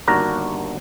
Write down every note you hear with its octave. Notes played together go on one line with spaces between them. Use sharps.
G1 D#2 D4 F#4 A#4 A#5